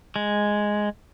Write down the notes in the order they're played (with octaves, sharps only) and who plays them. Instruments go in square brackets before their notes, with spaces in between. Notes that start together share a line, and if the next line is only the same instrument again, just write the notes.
[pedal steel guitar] G#3